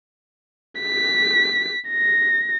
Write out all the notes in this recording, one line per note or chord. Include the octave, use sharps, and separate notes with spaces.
B6
A#6